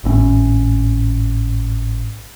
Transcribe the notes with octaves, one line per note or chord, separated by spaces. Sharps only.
G#1 A2 C4 C#4